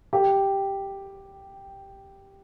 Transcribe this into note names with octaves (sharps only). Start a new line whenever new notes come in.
G4